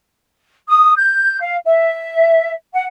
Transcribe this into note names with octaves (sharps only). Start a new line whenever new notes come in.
D#6
G6
F5
E5
F#5